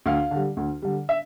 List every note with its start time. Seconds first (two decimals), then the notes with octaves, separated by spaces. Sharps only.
0.06 D2 F5
0.31 D3 G3
0.57 D2
0.82 D3 G3
1.09 E5